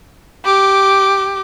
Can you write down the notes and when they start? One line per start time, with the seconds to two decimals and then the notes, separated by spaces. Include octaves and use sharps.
0.45 G4 D6